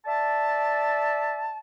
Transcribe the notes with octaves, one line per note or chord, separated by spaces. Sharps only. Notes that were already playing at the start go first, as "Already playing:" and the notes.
D5 E5 A5